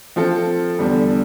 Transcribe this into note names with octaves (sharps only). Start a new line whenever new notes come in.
F3 C4 F4 A4
E2 D3 G3